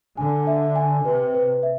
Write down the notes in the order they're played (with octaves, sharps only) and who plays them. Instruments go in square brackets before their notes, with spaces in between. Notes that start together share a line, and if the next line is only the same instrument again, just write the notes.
[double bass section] D3 [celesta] G#5
[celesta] E5
G#5
[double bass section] C3 [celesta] B4
[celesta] B4
E5